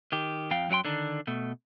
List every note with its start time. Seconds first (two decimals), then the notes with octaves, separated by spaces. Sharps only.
0.12 D#3 G4
0.51 F2 F3 F5 G5
0.69 F#2 F#3 F4 G5 C6
0.85 D3 D#3 D4
1.27 B2 A3